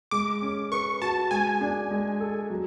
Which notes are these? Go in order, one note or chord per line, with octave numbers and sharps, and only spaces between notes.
G#3 D6
C#4
B4 C#6
F#4 A5
G#3 G#5
D4
G#3
A4
F#3